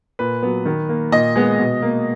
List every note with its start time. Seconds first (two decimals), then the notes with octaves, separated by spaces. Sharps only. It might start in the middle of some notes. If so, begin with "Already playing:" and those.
0.19 A#2 B4
0.43 F#3 B3
0.66 D#3
0.89 A#3
1.12 A#2 D#5
1.36 G#3 B3
1.59 B2
1.82 A#3